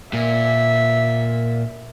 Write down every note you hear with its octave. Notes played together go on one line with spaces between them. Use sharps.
A#2 E5